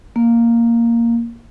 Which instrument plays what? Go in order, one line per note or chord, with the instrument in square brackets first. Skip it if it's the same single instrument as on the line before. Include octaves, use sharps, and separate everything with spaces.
[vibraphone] A#3